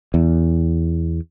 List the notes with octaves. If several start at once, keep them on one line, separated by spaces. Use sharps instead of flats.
E2